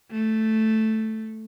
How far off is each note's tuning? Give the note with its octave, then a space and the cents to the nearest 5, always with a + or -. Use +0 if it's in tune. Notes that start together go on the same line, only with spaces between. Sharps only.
A3 +0